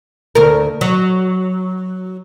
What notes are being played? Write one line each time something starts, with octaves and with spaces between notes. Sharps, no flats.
D2 A#4
F#3